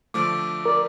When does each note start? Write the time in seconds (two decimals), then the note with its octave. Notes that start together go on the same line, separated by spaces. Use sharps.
0.14 D3 F3 A3 D6 E6 D7
0.66 A#4 D5